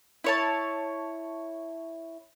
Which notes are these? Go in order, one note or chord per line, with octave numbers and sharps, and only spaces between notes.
E4 C#5 A5